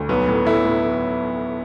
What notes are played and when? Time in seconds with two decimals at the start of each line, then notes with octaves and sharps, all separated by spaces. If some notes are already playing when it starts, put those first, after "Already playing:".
Already playing: D2
0.09 B1 B3
0.28 A2
0.46 A2 E4
0.65 A2